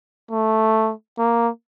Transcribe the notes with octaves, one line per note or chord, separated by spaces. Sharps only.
A3
A#3